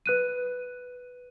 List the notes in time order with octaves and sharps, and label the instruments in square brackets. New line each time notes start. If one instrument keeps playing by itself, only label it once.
[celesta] B4 F#6 D#7